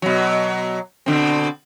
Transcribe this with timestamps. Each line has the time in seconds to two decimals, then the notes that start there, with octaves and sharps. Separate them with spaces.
0.02 B2 F#3
1.06 B2 D3 C4